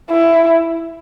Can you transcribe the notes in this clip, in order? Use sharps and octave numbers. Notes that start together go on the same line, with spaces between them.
E4